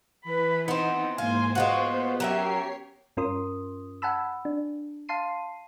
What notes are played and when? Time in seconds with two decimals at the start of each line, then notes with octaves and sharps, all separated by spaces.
0.24 E3 B4 B5
0.68 B3 C4 D#4
1.18 G#2 A#3 F4 C5 G#5
1.55 G#3 B3 F4 F#4 C5
2.20 F#3 C#4 G4 A#4 C#5 E5 C7
3.17 G2 C#4 F4 A#4 C6 D#6
4.02 F#5 G#5 A5 B5 E6
4.45 D4
5.09 F5 A5 C6 C7 D#7